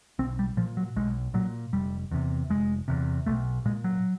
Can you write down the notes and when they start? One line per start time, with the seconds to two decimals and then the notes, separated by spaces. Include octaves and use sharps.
0.19 B1 C4
0.39 G3
0.57 A#2 F3
0.77 F#3
0.96 B1 G#3
1.34 A#2 F#3
1.73 F1 G3
2.11 E2 C3
2.49 F1 G#3
2.88 E2 C3
3.26 B1 A3
3.65 A#2 G#3
3.84 F#3